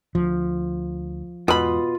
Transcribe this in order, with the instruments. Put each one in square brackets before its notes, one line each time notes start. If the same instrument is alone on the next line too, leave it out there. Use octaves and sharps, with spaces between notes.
[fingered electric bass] D2 [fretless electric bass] F3
[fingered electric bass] E2 G#2 [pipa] B2 B5 [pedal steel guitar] F4 D#6